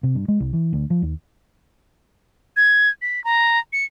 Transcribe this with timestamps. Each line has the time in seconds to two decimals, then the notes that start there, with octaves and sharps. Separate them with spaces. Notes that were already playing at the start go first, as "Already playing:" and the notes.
0.03 C3
0.15 G2
0.28 G#3
0.40 C2
0.53 E3
0.73 D2
0.90 F3
1.02 D#2
2.57 G#6
3.02 B6
3.24 A#5
3.73 C#7